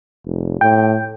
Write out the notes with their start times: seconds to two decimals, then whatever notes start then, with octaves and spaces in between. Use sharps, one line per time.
0.25 F1
0.61 A2 G5